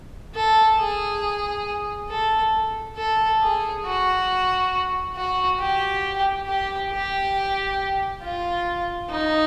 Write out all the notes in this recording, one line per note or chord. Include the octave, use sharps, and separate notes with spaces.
A4
G#4
A4
A4
G#4
F#4
F#4
G4
G4
G4
F4
D#4